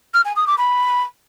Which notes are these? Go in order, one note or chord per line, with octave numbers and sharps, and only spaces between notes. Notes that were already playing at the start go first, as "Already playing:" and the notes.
F6
G#5
D#6
D6
B5